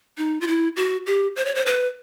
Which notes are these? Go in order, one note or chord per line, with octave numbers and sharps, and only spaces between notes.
D#4
F4
E4
F#4
G4
C5
C#5
C5
B4